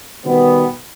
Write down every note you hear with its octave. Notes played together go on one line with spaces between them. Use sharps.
B2 D#3 G3 B3